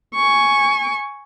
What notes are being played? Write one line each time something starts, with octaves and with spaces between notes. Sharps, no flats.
G#5 C#6